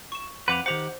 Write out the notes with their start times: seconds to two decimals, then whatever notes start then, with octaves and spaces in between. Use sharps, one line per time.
0.12 C#6 E7
0.48 F2 B4 F#5 D6 F7
0.66 D#3 G4 C5 F#5 F7